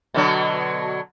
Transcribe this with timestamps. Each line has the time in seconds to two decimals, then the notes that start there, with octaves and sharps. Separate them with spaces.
0.14 B2 D3 F#3